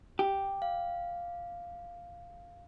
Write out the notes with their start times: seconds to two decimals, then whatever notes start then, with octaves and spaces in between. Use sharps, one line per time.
0.19 G4
0.62 F5